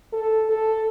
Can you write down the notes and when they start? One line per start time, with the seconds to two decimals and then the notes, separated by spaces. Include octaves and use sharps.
0.13 A4
0.49 A4